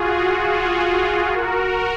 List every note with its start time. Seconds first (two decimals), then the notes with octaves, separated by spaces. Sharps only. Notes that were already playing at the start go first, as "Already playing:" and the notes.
Already playing: F4 F#4 G#4
0.19 F#4
0.46 F4 G#4
1.31 F#4 A#4